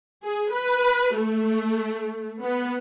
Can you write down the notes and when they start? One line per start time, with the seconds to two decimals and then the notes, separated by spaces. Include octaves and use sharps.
0.23 G#4
0.53 B4
1.18 A3
2.41 B3